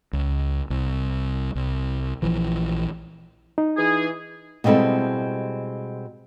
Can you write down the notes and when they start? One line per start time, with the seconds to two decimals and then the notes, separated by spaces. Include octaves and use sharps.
0.13 C#2
0.70 C2
1.55 C2
2.22 A#1 E3 F3
3.58 D#4
3.76 E3 G#4
4.64 B2 G3 G#3 C4 E4 A4